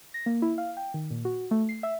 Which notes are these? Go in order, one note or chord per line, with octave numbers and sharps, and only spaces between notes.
A#6
A#3
E4
F5
G5
D#3
A#2
F#4
A3
C7
E5